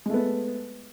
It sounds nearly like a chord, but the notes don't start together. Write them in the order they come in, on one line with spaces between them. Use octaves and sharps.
G#3 A3 B3